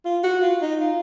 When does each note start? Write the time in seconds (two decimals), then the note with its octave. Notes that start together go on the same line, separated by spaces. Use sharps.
0.05 F4
0.24 F#4
0.42 F4
0.61 D#4
0.80 F4